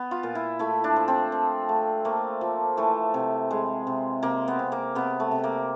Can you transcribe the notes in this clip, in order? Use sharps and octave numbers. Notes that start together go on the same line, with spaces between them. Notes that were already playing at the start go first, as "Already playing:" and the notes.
Already playing: B3
F4
A#2
E4
A3 E4
D4
F3
C4
F3
A3
A3 A#3
F3
E3 A3
C3
G#3
C3
C3 A#3
B3
C3
A#3
C3 B3
A3
C3
A#3